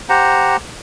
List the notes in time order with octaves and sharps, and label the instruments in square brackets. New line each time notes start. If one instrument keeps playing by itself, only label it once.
[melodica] G4 C5 F#5 A#5